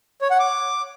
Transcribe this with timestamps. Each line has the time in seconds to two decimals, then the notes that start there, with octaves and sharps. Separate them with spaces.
0.21 C#5
0.31 F#5
0.40 D6